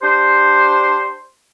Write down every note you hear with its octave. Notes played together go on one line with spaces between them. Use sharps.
D4 G4 C5